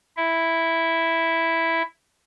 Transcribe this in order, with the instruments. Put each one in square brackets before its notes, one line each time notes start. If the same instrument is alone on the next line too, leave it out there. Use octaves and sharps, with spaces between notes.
[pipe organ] E4 E5